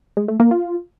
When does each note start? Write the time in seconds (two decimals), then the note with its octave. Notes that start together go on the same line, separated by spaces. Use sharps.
0.17 G#3
0.28 A3
0.40 A#3
0.51 F4